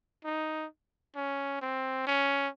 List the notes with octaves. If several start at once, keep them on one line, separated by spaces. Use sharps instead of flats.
D#4
C#4
C4
C#4